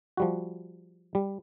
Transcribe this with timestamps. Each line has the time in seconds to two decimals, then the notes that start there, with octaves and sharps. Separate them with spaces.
0.17 F3 G3 F#4
1.15 G3